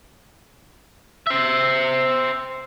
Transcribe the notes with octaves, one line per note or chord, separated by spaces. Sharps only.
C5 E5